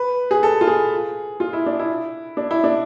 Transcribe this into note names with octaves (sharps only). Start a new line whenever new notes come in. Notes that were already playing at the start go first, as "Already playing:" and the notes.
Already playing: B4
G#4
A4
F4
G#4
F4
E4
D4
E4
D4
E4
D4